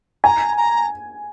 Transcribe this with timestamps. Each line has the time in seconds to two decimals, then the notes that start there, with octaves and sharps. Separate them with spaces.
0.24 G#5 A#5
0.57 A#5